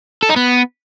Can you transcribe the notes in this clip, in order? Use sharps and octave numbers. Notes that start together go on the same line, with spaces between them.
A4
D#4
B3